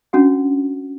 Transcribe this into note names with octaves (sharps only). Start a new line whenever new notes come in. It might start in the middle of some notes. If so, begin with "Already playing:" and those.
C#4 D4 F#4 F#5